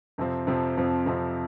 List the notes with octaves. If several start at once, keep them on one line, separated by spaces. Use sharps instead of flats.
F2 C3 F3 C4
F2 C3 F3 C4
F2 C3 F3 C4
F2 C3 F3 C4